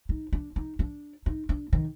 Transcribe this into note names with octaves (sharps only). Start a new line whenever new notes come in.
D#4
D4
D#4
D4
D#4
D4
D#3